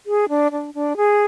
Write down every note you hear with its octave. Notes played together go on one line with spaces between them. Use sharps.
G#4
D4
D4
D4
G#4